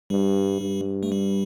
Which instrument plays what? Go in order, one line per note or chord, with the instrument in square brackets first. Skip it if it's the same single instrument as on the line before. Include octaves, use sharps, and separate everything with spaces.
[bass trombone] G2 [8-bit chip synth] G3
[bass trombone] G2
[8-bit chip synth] A3
G3